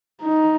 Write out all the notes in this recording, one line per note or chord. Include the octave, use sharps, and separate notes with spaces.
D#4